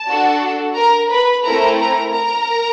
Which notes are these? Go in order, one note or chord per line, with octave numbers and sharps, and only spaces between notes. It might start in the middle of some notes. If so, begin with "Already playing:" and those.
Already playing: A5
D4 F#4 A4
A#4 A#5
B4 B5
A3 C4 E4 A4 A#4 A#5
A#4 A#5
A#4 A#5